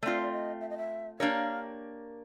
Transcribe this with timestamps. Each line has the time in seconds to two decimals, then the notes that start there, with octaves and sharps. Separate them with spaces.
0.03 A3 C4 F4 D5
0.22 D5
0.32 D#5
0.61 E5
0.70 D#5
0.78 E5
1.19 A#3 D4 G4 A#4 C#5 F5